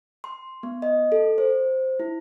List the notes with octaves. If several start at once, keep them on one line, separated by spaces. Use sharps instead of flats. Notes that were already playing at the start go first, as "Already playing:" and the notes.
C6
B3
D#5
A4
C5
E4